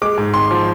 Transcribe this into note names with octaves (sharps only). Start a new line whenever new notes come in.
G#3 D6
G#2
G#1 C6
F3